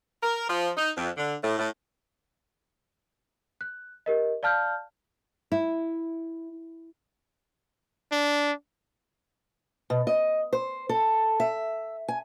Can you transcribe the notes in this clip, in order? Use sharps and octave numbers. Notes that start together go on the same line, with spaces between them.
A#4
F3
D#4
F2
D3
A2
A2
F#6
G4 A#4 D#5
D5 F5 A5 F6 G6
E4
D4
B2
D#5
C5
A4
E5
G#5